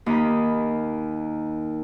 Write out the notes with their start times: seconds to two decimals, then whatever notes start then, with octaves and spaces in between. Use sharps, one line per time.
0.06 D#2 D#3 B5